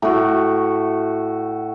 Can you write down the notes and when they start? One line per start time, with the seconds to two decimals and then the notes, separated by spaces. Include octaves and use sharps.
0.02 A2 F#4